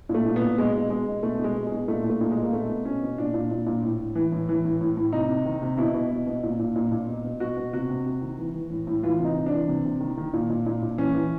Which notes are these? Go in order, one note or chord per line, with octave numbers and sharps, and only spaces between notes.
A#2
A3
A#2
B3
A#2
B2 G#3
B2
B2 G#3
B2
B2 A3
B2 G#3
B2
B2 G#3
A#2 A3
A#2
A3
A#2
G#3
A#2
A#3
B2 A3
B2
B2 C#4
B2
A#2 D4
A#2
A#2
A#2
A2
A2
E3
A2
E3
A2
A2
A2
C3 D#4
C3
D#3
C3
B2 E4
B2
B2
B2
A#2
A#2
A#2
A#2
B2
B2
B2 F#4
B2
C3 F#4
C3
C3
D#3
E3
E3
A2
A2
E3 F4
C3 D#4
C3
D4
E3
C3
C3
D#3
D#3
A#2
A#2
A#2
A#2
E3 C#4
E3